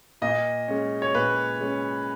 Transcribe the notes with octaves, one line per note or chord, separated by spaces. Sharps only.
A#2 D#5
G#3 C#4
C#5
A#2 B4
G#3 C#4